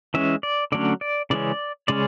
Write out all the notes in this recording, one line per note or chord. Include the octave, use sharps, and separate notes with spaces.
E3 G#3 C#4 E5
D5
D3 F#3 A3 C#4 D5
D5
C#3 E3 G#3 C#4 D5
C#3 G#3 C#4 D5